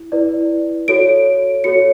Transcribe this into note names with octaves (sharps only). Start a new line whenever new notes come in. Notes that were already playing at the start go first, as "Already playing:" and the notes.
Already playing: E4
E4 B4 D5
F#4 A4 C#5 D7
F#4 A4 C#5 C#7